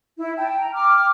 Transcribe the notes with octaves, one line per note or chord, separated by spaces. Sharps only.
E4
G5 A5
A#5
G5 D6 F6